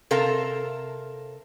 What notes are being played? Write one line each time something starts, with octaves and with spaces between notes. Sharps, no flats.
C3 A4 A#4 F5 A5